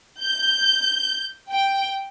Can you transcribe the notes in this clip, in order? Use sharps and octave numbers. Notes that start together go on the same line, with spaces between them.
G6
G5